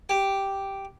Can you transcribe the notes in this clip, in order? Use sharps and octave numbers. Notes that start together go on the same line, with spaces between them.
G4